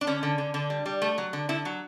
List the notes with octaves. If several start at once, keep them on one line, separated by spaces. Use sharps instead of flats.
D4
D3 C#4
D3
D3
D3
G3
G3
A3
F#3
D3
D3 E4
F#3